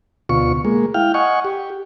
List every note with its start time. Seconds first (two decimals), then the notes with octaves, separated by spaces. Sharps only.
0.29 D2 B2 F4 C#6
0.65 G#3 A#3
0.94 E4 F5 G5 F6
1.14 D#5 F#5 G#5 C#6
1.45 G4